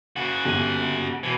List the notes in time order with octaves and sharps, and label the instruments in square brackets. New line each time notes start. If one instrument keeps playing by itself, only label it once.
[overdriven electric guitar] C#3 F#4
[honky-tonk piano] G1 G4 D#7
[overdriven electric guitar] B2 E3